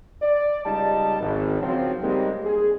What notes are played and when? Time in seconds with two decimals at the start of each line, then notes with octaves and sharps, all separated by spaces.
0.22 D5
0.65 C#2 G3 D#4 A5
1.20 G#1
1.62 C#3 F3 F#3 C4
2.03 G3 G#3 A#3 C4 D#4 G4
2.43 G#4